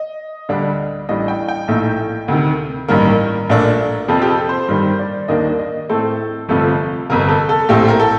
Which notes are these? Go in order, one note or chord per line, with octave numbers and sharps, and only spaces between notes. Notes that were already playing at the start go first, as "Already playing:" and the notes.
Already playing: D#5
D2 D3 G3 D4
A1 A2 G3 D4 D#5
G5
G5
A#1 A2 A3 D#4
D2 C3 D#3
A1 G2 D#3 G3 A#3 A#4
A#1 A#2 A3 D4
F2 C3 F3 C4 A4
G4
A4
C5
G2 D#3 G3 C5
D5
D#2 D#3 A#3 D4 D#5
D#5
A2 A3 C4 A4
G1 F2 C3 F3 A3 A4
G1 F2 C3 A#4
A4
A4
A#1 A2 A3 C4 G4
A#4
A4